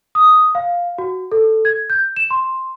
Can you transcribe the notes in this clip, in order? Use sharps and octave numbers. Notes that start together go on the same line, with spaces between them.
D#6
F5
F#4
A4
G#6
G6
E7
C6